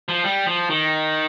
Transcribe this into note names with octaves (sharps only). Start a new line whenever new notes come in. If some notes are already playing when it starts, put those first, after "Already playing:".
F3
G3
F3
D#3